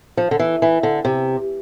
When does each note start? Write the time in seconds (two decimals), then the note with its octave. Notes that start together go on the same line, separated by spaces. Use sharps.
0.17 F3
0.31 D3
0.39 E3
0.62 E3
0.83 D3
1.05 C3